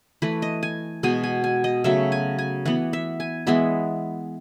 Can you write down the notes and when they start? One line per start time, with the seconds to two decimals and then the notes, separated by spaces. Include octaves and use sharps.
0.22 E3 A3 B4
0.42 D#5
0.63 G#5
1.03 B2 G#3 B3 G#5
1.24 G#5
1.44 G#5
1.64 D#5
1.84 C#3 F#3 A3 E5
2.12 G#5
2.38 G#5
2.65 E3 B3 F#5
2.93 E5
3.20 G#5
3.47 E3 G#3 B3 E5